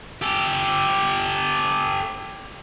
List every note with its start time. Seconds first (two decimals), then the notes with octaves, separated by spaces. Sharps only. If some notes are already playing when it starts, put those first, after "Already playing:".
0.22 G4 A4